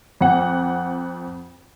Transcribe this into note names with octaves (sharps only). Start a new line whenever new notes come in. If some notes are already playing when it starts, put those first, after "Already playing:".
F2 F#5